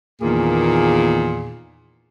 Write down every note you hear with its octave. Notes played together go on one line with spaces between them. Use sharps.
E2 A#2 D#3 A#3 G#4